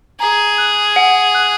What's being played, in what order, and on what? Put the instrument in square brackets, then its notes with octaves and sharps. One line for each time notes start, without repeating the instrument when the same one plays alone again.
[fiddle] G#4 [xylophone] A#5
[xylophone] F#6
F#5
F#6